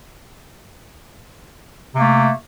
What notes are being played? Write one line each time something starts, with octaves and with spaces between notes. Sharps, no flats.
C3 A3 A#3